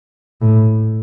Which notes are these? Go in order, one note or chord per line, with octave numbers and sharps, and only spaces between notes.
A2